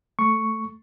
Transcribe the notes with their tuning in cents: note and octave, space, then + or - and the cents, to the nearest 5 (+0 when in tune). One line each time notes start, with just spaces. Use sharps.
A3 +0 C#6 +0